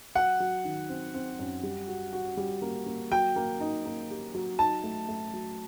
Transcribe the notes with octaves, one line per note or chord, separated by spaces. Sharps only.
F#3 F#5
F#3
D#3
C4
C4
F#2
G3
F#4
F#4
G3
A#3
A#3
F#3 G5
A#3
D#4
A#3
G4
F#3
D#4 A5
A3
A3
F#3